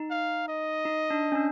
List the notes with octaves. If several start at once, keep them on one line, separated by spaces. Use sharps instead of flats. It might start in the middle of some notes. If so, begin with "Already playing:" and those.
Already playing: D#4
F5
D#5
D#4
D4
C#4
D4